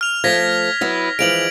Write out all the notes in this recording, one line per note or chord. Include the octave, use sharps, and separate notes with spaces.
F6 F7
F3 A3 G#6 A#6 B6
F#3 B3 E4
E3 F3 G#3 D7 F7 F#7